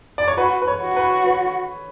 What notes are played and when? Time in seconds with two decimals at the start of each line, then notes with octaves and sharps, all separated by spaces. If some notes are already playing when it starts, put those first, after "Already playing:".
0.18 D5
0.28 C#5
0.37 F#4 B4
0.62 B4
0.68 C#5
0.83 F#4
0.97 B4
1.27 B4